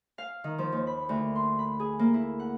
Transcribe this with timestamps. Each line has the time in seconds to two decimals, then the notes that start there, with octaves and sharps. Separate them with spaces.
0.18 F5
0.44 D#3
0.58 F3
0.72 D#2
0.87 B5
1.09 D2
1.36 C6
1.59 B5
1.80 G#4
1.99 A#3
2.14 E4
2.40 F#5